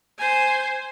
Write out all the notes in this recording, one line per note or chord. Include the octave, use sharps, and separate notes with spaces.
C5 G#5